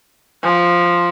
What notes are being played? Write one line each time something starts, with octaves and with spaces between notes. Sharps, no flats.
F3